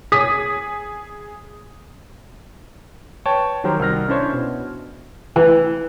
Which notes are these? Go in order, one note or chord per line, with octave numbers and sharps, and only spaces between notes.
G#4 D#6 B6
B4 C#5 G5 A5
D#3 F#3 G4 A#4 C5
C2 D#3 F6 A#6
C#4 D4 E4 C5 C#5
B2
E3